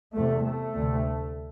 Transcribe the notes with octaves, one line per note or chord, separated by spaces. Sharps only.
E2 C3 A3
A3
D2 C3